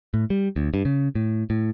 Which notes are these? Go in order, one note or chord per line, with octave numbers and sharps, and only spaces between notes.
A2
G3
D2
G2
C#3
A2
A2